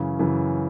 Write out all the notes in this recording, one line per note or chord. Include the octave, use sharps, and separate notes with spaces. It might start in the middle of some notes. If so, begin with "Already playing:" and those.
Already playing: F#2 C#3 E3
F#2 C#3 E3